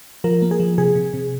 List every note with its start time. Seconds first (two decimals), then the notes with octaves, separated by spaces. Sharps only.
0.24 F3 A#4
0.42 A#3
0.51 G#4
0.60 F3
0.78 C3 G#4
0.95 C3
1.13 C3